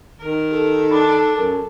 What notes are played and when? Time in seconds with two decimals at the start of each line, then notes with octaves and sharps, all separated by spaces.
0.19 D#3 A#4
0.51 G4 A4
0.91 D4 D#4 B5
1.36 F#2 A#4